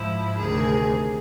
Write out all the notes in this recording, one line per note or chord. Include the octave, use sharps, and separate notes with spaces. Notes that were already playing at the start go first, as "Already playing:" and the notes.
Already playing: G#2 F3 E4
D2 C3 D#3 G#4